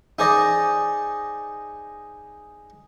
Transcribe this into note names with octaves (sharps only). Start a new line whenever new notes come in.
D#4 G#4 C5 D5 D#5